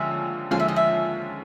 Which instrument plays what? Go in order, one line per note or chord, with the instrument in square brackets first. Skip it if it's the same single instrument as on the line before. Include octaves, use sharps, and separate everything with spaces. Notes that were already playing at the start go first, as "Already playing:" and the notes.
Already playing: [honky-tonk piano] D#2 D3 F3 G#3 C#4 [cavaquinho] E5
[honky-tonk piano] D#2 D3 F3 G#3 C#4 [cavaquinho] F5
[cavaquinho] E5
D#5
E5